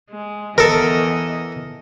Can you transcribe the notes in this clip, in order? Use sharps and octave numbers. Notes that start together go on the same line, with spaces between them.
G#3
E2 E3 A4 A#4 D#5